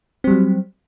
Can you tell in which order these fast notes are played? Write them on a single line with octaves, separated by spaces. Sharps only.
C4 G3 F#3